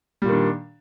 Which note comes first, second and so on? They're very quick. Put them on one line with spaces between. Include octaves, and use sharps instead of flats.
G3 A#2 D#3 D4